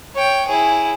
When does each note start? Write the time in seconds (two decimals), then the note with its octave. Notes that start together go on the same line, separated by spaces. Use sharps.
0.15 C#5 G5
0.48 E4 G#4